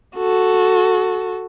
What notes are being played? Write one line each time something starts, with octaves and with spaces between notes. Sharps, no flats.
F#4 A4